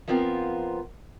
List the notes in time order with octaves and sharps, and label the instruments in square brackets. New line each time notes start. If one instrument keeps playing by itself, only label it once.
[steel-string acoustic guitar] F3 B3 C4 F4 A#4